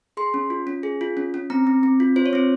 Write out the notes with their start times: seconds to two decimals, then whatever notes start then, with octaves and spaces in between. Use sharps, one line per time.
0.17 G#4 C6
0.34 C#4
0.50 F4
0.67 C#4
0.83 G#4
1.01 F4
1.17 C#4
1.34 C#4
1.50 C4 A#5
1.67 C4
1.83 C4
2.00 F4
2.16 F4 C5
2.26 C#5
2.33 C4 C5